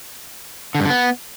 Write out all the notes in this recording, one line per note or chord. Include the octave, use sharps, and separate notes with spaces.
D3
G2
D3
B3